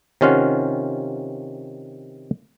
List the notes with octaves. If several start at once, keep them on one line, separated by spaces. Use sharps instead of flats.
C3 D#3 C#4 F4 F5 F#5